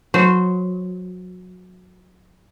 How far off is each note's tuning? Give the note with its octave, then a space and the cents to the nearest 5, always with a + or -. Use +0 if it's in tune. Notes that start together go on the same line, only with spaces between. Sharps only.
F#3 -25 C5 -15